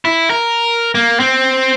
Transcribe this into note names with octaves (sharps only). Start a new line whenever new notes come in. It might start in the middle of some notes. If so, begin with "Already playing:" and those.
E4
A#4
A#3
C4